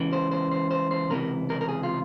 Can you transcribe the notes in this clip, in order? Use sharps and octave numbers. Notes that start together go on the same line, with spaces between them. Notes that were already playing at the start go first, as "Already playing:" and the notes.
Already playing: C#2 C#3 E3
C5
C5
C5
C5
C5
C#2 C3 E3 A#4
A#4
A#4
G#4
F4